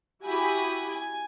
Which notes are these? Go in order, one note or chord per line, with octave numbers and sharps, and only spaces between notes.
E4 F#4 G4 G#5 B5 D#6
G#5